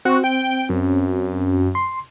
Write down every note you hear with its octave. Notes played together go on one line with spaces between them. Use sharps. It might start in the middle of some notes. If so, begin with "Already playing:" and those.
C4 F#4
G5
F#2
C6